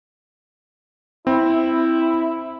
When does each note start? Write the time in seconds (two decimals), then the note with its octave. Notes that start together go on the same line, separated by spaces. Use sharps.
1.27 C4 E4